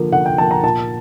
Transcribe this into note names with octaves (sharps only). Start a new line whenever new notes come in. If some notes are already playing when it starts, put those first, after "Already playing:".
Already playing: D3 F3 A#3
D3 F#5
G5
F3 A#3 A5
A#5
A#2 A5